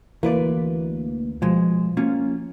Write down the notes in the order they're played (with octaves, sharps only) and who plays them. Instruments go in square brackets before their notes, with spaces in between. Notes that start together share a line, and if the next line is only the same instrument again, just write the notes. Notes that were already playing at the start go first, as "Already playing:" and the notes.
[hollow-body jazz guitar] D2 B4 D5 [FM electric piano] E3 A#3
[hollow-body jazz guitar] B2 G#3 [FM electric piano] F3
[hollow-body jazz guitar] A#3 C#4 F4